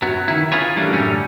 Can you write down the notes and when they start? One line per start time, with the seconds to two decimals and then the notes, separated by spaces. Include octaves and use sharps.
0.02 F#2 F#3 B3
0.28 D#3 E4
0.52 C#4 F4 G#4 B4 C#5
0.77 E3 G3 A3 A#3 C#4 D4
0.92 F#2 A2 D3 G3 C#4